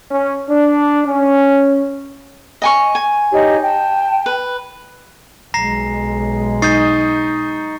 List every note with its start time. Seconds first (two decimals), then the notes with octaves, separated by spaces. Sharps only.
0.11 C#4
0.49 D4
1.06 C#4
2.62 D#5 G#5 C#6
2.95 G#5
3.31 D#4 G4 C#5
3.62 G5 A5
4.26 B4
5.54 B1 G#3 A#5 A#6 C7
6.62 D#4 C#6 D#6 G6 A6 C7